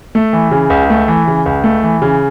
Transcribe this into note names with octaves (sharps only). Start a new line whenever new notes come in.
A3
E3
C#3
C#2
A3
E3
C#3
C#2
A3
E3
C#3